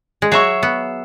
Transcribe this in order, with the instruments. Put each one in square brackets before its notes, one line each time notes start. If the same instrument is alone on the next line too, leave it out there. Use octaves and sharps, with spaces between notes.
[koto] G#3
[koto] F#3 [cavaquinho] G#4 C#5 E5 C#6
[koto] B3